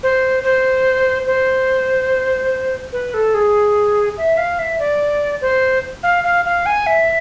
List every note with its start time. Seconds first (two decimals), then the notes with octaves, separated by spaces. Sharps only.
0.03 C5
0.44 C5
1.26 C5
2.92 B4
3.14 A4
3.34 G#4
4.17 E5
4.37 F5
4.59 E5
4.79 D5
5.41 C5
6.03 F5
6.24 F5
6.45 F5
6.66 G#5
6.86 E5